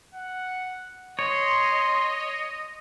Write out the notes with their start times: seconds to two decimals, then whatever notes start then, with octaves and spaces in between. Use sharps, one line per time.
0.15 F#5
1.19 C#5 D#5 C6